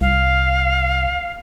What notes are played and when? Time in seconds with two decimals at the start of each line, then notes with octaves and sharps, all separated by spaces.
0.01 C2 F5